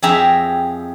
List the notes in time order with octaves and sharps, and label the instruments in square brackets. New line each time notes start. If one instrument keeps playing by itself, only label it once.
[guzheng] F2 G4 G#4 E5 A#5 B5